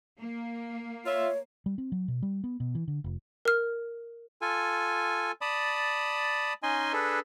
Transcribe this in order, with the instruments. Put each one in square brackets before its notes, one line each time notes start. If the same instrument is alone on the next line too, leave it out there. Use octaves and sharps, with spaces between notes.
[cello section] A#3
[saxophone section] F4 E5 [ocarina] C#5
[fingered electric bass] G3
C4
F#3
B2
G3
B3
B2
E3
D3
F1
[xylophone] A#4 F6
[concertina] F4 A4 G#5
D5 A5 B5 D#6
C#4 D#4 D#5 G#5 C6
D4 G#4 A4 B4